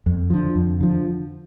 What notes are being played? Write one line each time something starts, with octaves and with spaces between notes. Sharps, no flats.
F2
D3 F3
F2
D3 F3